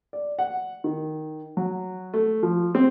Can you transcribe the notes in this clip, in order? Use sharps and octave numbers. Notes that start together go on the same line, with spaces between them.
D5
F#5
D#3
F#3
A3
F3
C4